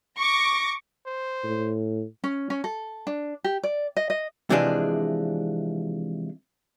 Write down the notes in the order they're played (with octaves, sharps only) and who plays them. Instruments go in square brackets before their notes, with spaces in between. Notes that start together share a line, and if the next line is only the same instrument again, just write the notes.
[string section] C#6 D6 A#6
[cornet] C5
[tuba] A2
[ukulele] C#4
C#4
A4
D4
G4
D5
D#5
D#5
[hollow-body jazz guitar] C3 E3 F3 G#3 D4 G#4